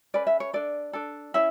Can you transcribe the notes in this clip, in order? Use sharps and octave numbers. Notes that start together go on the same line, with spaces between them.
C#4 G#4 B4 D5
E5
C#5
D4 A4 D5
D4 A4
C#4 E4 E5